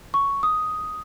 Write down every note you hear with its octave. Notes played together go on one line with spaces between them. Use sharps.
C#6
D#6